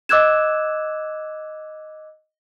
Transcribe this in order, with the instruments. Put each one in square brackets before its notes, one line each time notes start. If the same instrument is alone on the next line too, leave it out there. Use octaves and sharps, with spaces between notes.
[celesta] D#5 D6 E6 F#6 G#6 E7